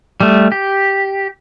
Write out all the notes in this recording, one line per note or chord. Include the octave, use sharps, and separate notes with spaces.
G3 A3
G4